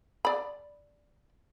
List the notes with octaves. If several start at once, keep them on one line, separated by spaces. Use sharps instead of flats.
D5 B5